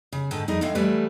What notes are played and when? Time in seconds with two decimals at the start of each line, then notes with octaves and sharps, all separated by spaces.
0.13 C#3
0.31 G#2 D3 D#3 B4 A5
0.48 F2 G3 D#4 G#4 A#4 D#5
0.61 A2 D3 E3 G#3 F5
0.75 E3 F#3 G3 A3 B4